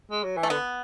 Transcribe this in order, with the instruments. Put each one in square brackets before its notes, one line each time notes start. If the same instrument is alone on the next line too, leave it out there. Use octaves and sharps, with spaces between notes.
[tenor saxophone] G#3
F#3
E3
[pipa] A3
[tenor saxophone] D3 [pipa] B3